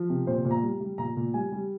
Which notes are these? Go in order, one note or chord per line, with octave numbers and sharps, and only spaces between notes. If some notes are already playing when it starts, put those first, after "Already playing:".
Already playing: F3
C3
A#2 C5
A#2
A#5
G3
G3
A#2 A#5
A#2
G3 G#5
G3